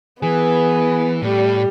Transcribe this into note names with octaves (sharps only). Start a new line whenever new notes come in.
E3 B3 G#4 B4
A2 G3